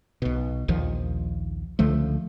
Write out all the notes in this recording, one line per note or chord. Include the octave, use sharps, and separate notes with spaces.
B1 B2
A#1 D#2 D#3 F3
C#2 D3 F3 A3